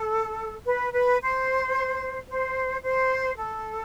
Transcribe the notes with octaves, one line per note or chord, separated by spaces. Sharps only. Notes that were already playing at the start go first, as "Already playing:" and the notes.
Already playing: A4
B4
B4
C5
C5
C5
A4